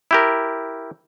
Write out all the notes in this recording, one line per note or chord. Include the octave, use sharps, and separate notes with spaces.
E4 G4 A#4